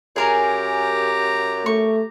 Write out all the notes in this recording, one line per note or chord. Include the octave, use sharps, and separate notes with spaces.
F#2 G4 G#4 A#4 G#5 A#5
A3 C#6